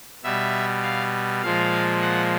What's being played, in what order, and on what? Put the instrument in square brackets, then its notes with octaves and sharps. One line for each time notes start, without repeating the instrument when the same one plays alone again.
[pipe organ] B2 G3 E5
F5
A#2 F3 G#3 F5
F#5